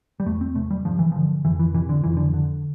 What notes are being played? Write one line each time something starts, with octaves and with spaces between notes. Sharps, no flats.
G3
E2 A3
C4
C3 A3
G3
G2 F3
E3
D3 F3
F2 E3
E3
C3 E3
D3
F2 E3
D3
D3